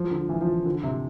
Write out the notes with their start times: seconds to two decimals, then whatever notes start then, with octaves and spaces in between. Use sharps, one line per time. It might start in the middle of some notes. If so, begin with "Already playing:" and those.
Already playing: F3
0.11 D3
0.29 E3
0.41 F3
0.65 D3
0.83 C3